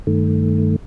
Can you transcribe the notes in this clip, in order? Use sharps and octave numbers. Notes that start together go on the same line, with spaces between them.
G2 D#3 A3